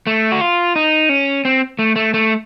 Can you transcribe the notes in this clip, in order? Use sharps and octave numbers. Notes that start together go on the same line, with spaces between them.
A3
F#4
F4
D#4
C#4
C4
A3
A3
A3